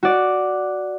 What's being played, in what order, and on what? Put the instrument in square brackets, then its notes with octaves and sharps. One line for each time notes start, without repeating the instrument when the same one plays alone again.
[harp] F#4 D5